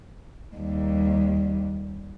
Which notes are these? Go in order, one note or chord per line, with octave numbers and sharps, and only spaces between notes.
D#2 G3